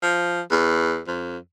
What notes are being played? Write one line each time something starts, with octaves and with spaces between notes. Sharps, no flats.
F3
E2
F2